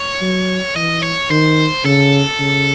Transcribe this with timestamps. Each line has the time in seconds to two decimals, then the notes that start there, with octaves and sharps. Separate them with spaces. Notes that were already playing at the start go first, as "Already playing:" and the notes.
Already playing: C#5
0.21 F#3
0.75 E3 D#5
1.03 C#5
1.30 D#3 C5
1.84 C#3 A4
2.40 C#3